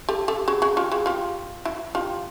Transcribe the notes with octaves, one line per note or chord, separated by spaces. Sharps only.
G4 A4
G4 A4
F#4 G#4
F#4 G#4
F4 G4
F#4 G#4
F4 G4
E4 F#4
F4 G4